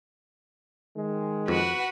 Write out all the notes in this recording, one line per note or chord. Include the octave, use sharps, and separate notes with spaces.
D#3 G#3
F2 F#4 B4 F#5